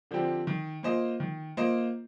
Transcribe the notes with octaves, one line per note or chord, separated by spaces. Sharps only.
D3 F3 C4 G4
D#3
A#3 F4 C5 D#5
D#3
A#3 F4 C5 D#5